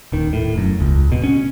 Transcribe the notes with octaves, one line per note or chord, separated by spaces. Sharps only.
D#1 D#3
A2
E1 F#2
E1 C#2
D1 B2
C#4